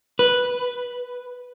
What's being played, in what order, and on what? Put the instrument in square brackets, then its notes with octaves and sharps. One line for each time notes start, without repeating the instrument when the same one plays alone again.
[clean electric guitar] B4